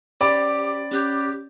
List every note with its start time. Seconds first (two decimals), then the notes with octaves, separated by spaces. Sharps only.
0.21 C#4 G4 C5 D5 G5 B5 D6
0.91 C#4 G4 F#6 G6